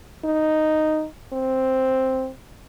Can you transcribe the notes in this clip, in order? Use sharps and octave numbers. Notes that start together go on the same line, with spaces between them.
D#4
C4